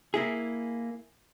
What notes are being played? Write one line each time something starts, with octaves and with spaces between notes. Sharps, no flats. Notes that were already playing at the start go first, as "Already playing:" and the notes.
A#3 E4 G#4